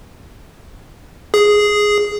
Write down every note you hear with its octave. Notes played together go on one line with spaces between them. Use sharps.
G#4